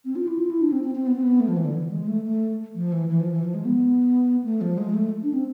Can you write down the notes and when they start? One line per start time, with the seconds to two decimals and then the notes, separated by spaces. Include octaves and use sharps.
0.05 C4
0.16 F4
0.27 E4
0.39 F4
0.50 E4
0.62 D4
0.72 C4
0.83 C4
0.95 C4
1.07 B3
1.16 C4
1.23 B3
1.40 A3
1.48 F3
1.56 E3
1.65 D3
1.74 E3
1.91 G#3
2.07 A3
2.24 A3
2.75 F3
2.92 E3
3.09 E3
3.20 F3
3.31 E3
3.43 F3
3.54 G#3
3.65 B3
4.44 A3
4.61 F3
4.78 G#3
4.94 A3
5.23 D4
5.33 C4